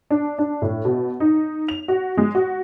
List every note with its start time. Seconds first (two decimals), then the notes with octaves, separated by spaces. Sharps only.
0.10 D4
0.39 D4
0.62 A2
0.85 B2
1.20 D#4
1.68 F7
1.88 F#4
2.17 G#3
2.35 F#4